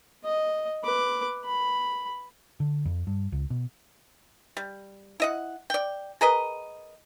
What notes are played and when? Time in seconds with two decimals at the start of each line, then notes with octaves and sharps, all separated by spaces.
0.24 D#5
0.84 B4 D6
1.45 B5
2.60 D3
2.85 F2
3.07 G2
3.32 C#2
3.50 B2
4.57 G3
5.20 E4 D#5 F#5
5.70 D5 G5
6.21 G#4 A#4 B4 D#5